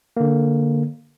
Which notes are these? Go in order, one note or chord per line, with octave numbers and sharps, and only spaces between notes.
D3 A#3